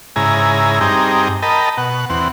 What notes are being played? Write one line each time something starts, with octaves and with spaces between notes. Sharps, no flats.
G#2 C#3 E4 G#5 A#5
G2 C4 D#4 G#4 G5 A#5
A#4 D#5 G5 A5 B5
B2 F#5
E2 C4 F#5